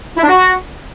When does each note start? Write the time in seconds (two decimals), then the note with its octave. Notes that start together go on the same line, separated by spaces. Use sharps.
0.17 E4
0.23 D4
0.29 F#4